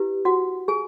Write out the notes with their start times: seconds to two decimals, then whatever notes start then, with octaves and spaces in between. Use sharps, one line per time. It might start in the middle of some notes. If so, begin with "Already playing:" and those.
Already playing: E4 G4 B4
0.25 F#4 F#5
0.68 G#4 G#5